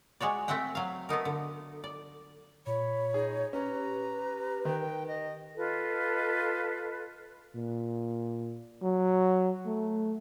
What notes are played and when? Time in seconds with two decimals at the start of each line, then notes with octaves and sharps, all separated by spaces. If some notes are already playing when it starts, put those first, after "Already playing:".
0.21 G#3 F#4 C#5 D5
0.48 A3 C4 E5 F#5 G5
0.75 F#3 F5
1.09 A3 B3 D#4 A#4
1.25 D3
1.84 D5
2.67 A#2 C#5 B5
3.14 D#4 G#4
3.53 C#4 G4 B4 A#5
4.65 D#3 G5
5.08 D#5
5.56 F4 A4 B4 D#5
7.55 A#2
8.82 F#3
9.66 A3